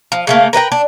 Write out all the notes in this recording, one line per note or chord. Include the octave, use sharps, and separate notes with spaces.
F3
C#3 A3 A#3
A#4 B4 D#5 G5
D4